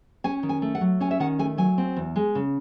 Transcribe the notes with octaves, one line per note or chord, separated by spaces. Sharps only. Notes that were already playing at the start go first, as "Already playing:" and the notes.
C#4 G#5
D#3
G#5
A3
F#5
F#3
C#4 G#5
E5
D#3 F#5
A3 G#5
F#3 G#5
C4
E2
G#3
C#3